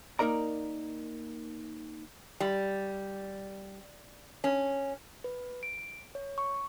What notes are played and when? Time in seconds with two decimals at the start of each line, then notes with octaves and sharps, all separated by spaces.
0.19 A#3 D#4 A#4 D5 A#5
2.40 G3
4.44 C#4
5.24 B4
5.63 D7
6.15 C#5
6.38 C#6